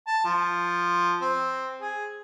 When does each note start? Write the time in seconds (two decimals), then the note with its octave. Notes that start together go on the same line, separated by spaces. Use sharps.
0.07 A5
0.24 F3
1.21 C4
1.81 G#4